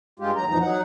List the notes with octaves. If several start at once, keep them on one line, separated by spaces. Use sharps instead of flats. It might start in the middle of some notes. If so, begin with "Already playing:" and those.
G2 G#3 F4 G4
D#2 F#3 A#5
F2 A#2 E3 F3 D#4 A#5
F#3 D#4 F#5